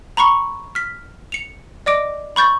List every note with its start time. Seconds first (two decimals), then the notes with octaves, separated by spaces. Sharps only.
0.17 A#5 B5 C#6 C#7
0.75 F6 B6
1.32 C#7 F7
1.86 D5 D#5 D6 D7
2.36 B5 C#6 G6 A6